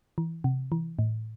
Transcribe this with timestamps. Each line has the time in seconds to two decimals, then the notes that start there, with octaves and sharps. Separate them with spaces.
0.18 E3
0.44 C3
0.72 E3
0.99 A2